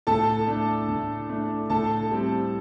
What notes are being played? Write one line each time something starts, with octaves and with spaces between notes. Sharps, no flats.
A2 A4 A5
A3 D4
A2
A3 D4
A2 A4 A5
G3 C4